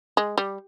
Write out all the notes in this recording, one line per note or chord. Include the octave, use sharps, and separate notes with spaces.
G#3
G3